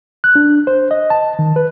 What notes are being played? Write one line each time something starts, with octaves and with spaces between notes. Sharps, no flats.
F#6
D4
C5
D#5
A5
D#3
B4